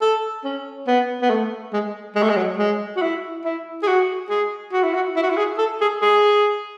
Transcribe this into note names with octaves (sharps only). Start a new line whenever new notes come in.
A4
C#4
B3
B3
A3
G#3
G#3
A3
G#3
F#3
G#3
F#4
E4
E4
G#4
F#4
G#4
F#4
E4
F#4
E4
F#4
E4
G#4
A4
G#4
G#4